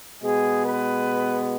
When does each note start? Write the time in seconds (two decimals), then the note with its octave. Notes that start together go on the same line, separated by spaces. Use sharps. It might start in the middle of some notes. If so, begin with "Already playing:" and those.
0.22 B2 G#3 B3 G#4
0.65 B4